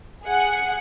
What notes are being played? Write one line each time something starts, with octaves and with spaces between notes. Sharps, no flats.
G#4 F#5